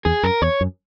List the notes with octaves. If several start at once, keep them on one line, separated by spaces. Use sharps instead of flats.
E2 G#4
F#2 A#4
E2 C#5
F#2